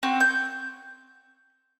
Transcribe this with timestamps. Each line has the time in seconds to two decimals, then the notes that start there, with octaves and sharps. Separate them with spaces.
0.03 C4 F#4
0.20 G6